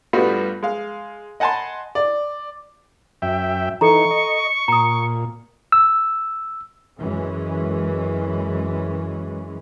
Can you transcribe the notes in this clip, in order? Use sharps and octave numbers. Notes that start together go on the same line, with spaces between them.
G2 G3 A3 B3 F4 F#4
G#3 F5
D#5 F#5 G#5 A5 B5 C6
D5
F#2 E5 G5
E3 D#4 A4 A#5 C#6
D#5
A#2 A#5 D#6
E6
F#2 E3 G#3 C#4